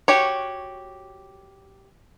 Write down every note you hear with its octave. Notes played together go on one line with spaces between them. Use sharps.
F#4 G4 C#5